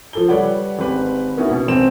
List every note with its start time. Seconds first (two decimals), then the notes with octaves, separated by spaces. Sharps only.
0.13 F3 A4 G7
0.28 G3 A4 B4 C#5 D5 F#5
0.79 G#1 G4 B4
1.37 A#3 B3 C#4 D#4 E4 F#4
1.51 B2
1.68 G#1 C4 E7